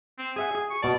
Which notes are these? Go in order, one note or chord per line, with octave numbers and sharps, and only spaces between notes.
C4
G#4 E5 F#5 G#5
G#4
C#6
B2 D5 A5